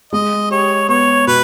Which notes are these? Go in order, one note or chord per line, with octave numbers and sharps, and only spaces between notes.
G#3 D#5
G4 C#5
B3 C#5
B2 B4